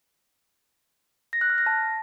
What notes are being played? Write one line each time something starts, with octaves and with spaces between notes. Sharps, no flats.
A#6
F#6
F6
A#6
A5